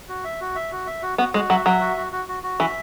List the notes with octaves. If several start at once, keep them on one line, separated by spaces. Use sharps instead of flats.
F#4
E5
F#4
E5
F#4
E5
F#4
B3 F#4
G#3 F#4
F#3 E5
F#3 E5
F#4
F#4
F#4
F#4
F#4
E3 E5